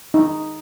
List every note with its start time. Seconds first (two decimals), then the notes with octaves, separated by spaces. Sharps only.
0.14 D#4